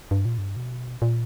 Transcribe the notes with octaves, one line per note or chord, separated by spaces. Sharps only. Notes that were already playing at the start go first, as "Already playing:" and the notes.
G2
A#2
G2
B2
A#2